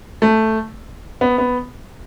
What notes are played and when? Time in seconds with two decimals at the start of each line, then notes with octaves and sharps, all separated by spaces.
0.22 A3
1.21 B3
1.38 B3